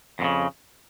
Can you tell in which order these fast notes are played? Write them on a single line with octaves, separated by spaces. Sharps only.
F2 A#2 C#3